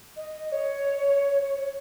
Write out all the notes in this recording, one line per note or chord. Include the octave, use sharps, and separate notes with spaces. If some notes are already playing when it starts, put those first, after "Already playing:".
D#5
D#5
C#5